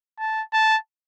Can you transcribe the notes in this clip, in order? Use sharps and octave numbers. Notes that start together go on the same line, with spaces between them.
A5
A5